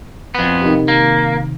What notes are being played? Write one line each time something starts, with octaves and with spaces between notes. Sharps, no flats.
F2 B3
C3 D#3
A#3